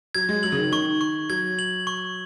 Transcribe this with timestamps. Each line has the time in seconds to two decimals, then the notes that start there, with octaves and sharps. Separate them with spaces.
0.15 F#3 G#6
0.29 G#3
0.43 F#3 F#7
0.52 C#3
0.58 D#3
0.72 D#3 C#6
1.01 C#6
1.30 F#3 G#6
1.59 F#7
1.87 C#6